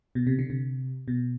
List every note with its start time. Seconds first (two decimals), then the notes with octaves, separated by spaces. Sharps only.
0.15 B2
0.27 C3
0.39 D3
0.50 C3
1.08 B2